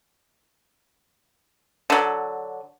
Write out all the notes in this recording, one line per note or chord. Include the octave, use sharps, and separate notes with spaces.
D3 F#3